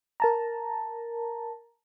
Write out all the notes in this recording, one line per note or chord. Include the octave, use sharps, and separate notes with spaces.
A#4 A5 A#5